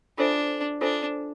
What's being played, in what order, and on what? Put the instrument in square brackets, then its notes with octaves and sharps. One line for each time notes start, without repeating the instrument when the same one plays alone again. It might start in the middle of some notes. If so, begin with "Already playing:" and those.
[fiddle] D4 [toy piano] F4 A4 C5 E5 G#5
[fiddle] D4 [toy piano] F4 A4 C5 E5 G#5